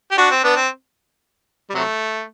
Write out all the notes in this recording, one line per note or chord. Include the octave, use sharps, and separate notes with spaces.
G4
D4 F#4
C4
B3 D4
C4
G3
C3 F#3 A3